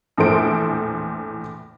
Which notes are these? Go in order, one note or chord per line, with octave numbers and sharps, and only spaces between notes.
A#1 E2 A2 A4 C5 D7